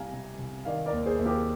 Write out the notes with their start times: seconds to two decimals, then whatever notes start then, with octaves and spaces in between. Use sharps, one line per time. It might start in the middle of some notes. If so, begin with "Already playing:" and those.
Already playing: C2 G3 F5 G#5 A#5
0.13 C3
0.38 C2
0.65 D#3 D5 F5
0.86 A#4 D5
0.92 D#2
1.06 G#4 C5
1.19 D#2
1.25 G4 A#4